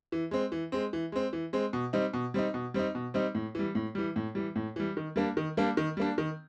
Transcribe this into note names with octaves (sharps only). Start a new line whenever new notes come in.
E3
G#3 C4
E3
G#3 C4
E3
G#3 C4
E3
G#3 C4
B2
G3 C4 D#4
B2
G3 C4 D#4
B2
G3 C4 D#4
B2
G3 C4 D#4
A2
E3 G3
A2
E3 G3
A2
E3 G3
A2
E3 G3
D#3
G3 A#3 D4
D#3
G3 A#3 D4
D#3
G3 A#3 D4
D#3